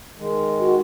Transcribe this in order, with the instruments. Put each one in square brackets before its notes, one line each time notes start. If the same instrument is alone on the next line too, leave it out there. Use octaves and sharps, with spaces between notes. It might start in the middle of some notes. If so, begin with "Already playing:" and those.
[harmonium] D#3 G#3
[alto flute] F#4